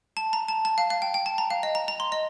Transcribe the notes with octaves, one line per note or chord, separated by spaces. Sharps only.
A5
A#5
A5
A5
F5
F5
G5
G5
A5
A#5
F5
D#5
A#5
A#5
C6
D#5